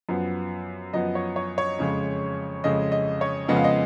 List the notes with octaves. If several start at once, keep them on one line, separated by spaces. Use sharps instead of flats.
F#2 F3 B3
F#2 F3 B3 D#5
C#5
C#5
C#5
F2 C#3 G#3
F2 C#3 G#3 D#5
D#5
C#5
F2 C#3 F3 G#3 B3 D#5
F5
D#5